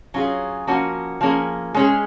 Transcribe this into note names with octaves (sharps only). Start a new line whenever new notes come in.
F#3 C#4 F4 G#4
F3 A#3 C#4 F#4
F3 A#3 C#4 G#4
G#3 C#4 G#4